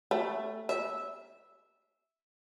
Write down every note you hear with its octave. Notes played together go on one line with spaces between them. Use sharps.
A3
E5